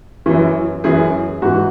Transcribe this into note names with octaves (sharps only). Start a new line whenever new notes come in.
F#2 E3
F#2 E3 G#4
G#2 E3 F#4